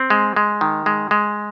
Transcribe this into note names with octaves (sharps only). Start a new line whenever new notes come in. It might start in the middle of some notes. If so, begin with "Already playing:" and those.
Already playing: C4
G#3
G#3
D#3
G#3
G#3